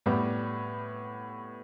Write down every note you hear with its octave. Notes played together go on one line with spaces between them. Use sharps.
A2 G3 B3